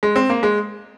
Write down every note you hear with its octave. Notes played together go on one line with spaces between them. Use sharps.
G#3
C4
A#3
G#3